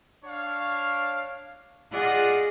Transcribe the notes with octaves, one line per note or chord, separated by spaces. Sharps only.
D4 C#5 F5
F4 G#4 D5 D#5 F#5